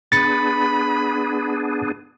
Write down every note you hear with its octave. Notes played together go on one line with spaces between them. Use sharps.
B3 D4 G#4 B5 A6 C#7